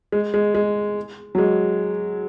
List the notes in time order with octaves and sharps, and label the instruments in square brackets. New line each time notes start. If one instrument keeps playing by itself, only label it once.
[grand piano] G#3
G#3
G#3
F#3
G#3